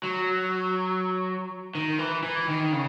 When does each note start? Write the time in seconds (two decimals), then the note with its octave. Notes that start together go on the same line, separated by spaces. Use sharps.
0.03 F#3
1.75 D#3
1.99 E3
2.23 E3
2.47 D#3
2.73 C#3